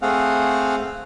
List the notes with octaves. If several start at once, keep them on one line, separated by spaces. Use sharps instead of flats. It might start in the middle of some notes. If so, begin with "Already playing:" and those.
A3 C4 G#4 F5 F#5